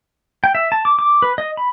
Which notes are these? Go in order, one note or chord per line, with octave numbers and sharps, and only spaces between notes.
G5
E5
A5
D6
D6
B4
D#5
B5